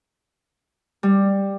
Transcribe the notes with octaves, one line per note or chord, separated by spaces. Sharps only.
G3